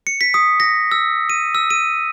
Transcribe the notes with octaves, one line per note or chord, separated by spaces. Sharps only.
C#7
B6
D#6
A#6
E6
D#7
E6
D#7